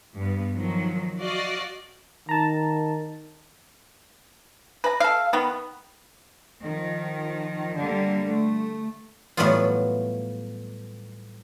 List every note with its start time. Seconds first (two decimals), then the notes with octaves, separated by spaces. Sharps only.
0.16 G2 B3
0.55 D#3 F3 F#3
1.21 F#4 D5 D#5 F5
2.29 D#3 A5 A#5
4.84 B4 A#5
5.00 A4 F5
5.33 D#3 B3
6.64 D#3 F3
7.77 D3 G3 A#3
8.27 A3
9.37 A2 E3 F#3 G3 B3 F4